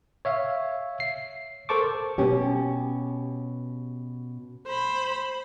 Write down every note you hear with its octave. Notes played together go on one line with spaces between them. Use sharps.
C#5 E5 F5
C7
A4 A#4 C5 A5 C#6 D6
B2 C#4 G4
C5 B5